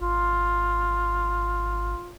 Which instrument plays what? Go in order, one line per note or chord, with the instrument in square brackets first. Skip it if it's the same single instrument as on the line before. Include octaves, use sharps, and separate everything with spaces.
[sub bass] G#1 [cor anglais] F4